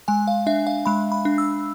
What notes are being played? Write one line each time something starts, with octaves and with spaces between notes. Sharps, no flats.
G#3 G#5
F5
D4 E5
F5
G#3 B5
B5
D4
E6